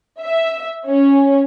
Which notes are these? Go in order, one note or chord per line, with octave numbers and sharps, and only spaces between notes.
E5
C#4